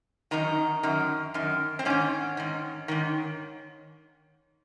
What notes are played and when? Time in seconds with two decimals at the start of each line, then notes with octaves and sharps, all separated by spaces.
0.31 F#2 D#3 D#4
0.83 F#2 D#3
1.34 F#2 D#3
1.79 C4
1.85 G#2 D#3 C#4
2.37 G#2 D#3
2.88 G#2 D#3